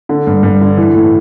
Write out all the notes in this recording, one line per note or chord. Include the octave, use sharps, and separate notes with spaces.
D3
G2
G2
D3
E3
A2